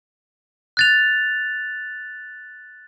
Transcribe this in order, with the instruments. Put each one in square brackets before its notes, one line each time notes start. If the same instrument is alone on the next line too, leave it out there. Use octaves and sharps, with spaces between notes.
[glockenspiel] F#6 A6 F7